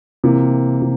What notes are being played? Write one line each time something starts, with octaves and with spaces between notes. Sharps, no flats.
C3 E3 A#3
C3